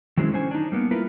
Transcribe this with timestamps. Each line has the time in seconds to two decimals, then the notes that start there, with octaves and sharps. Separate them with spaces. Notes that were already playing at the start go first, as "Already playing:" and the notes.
0.17 D#3 F#3 G#3 C4 C#4 E4
0.32 D3 C#4 C5 G#5
0.51 D4 D#4
0.72 G3 A#3 B3
0.91 E4 F4 A#4 B4